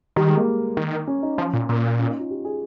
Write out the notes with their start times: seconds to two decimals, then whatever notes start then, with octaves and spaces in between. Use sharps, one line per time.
0.16 D#3 G3
0.27 G#3
0.37 A#3
0.77 D#3
1.07 C#4
1.22 D#4
1.38 F3 C#4
1.54 A#2
1.69 A#2
1.99 C#4
2.09 D#4
2.19 F4
2.30 G4
2.45 G#4